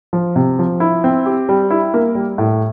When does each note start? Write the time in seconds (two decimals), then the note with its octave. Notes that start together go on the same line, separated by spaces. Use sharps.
0.13 F3
0.36 C3
0.59 F3
0.80 E4
1.04 C4
1.26 G4
1.49 G3
1.70 E4
1.94 A#3
2.15 G3
2.38 A2